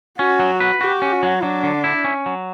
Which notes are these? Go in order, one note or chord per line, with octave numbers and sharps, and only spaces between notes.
C#4 F#4
F#3
B4
F#4 G4
C#4
F#4
F#3
F#3 D4
D3
E4
C#4
F#3